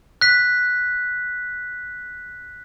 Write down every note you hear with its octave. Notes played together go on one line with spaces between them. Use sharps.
F#6 B6